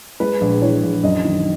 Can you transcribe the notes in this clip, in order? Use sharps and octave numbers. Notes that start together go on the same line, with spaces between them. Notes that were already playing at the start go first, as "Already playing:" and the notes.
G#3 B4
A#1
E3 C#5
A#1
F#2 D#5
D#3